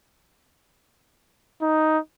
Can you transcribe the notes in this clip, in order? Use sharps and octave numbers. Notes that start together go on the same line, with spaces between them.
D#4